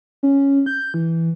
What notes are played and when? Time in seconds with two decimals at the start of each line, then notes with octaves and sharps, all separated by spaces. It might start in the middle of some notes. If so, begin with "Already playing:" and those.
0.23 C#4
0.66 G6
0.94 E3